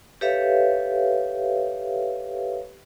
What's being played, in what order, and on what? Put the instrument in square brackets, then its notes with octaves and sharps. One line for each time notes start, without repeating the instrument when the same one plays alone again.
[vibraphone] G4 A4 B4 C#5 E5 F5